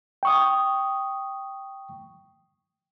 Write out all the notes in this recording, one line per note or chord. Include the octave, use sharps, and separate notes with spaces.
G5 C#6 D#6